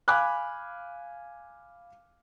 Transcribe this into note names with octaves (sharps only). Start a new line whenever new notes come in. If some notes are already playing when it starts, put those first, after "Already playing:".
F5 G#5 B5 D6 F6 F#6